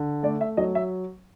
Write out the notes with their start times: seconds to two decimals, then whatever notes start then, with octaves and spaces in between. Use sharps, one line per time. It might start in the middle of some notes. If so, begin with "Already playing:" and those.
Already playing: D3
0.23 A3 D5
0.41 E5
0.57 F#3 D#5
0.75 E5